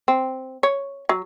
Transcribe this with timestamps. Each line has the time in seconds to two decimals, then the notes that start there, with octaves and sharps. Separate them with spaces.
0.08 C4
0.63 C#5
1.09 F#3